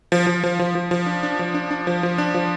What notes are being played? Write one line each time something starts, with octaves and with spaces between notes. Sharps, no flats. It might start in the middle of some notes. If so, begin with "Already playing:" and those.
F3
F3
F3
F3
F3
F3
D4
D4
F3
D4
D4
F3
F3
D4
F3